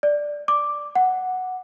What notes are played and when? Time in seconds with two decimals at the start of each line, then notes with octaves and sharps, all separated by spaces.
0.03 D5
0.48 D6
0.95 F#5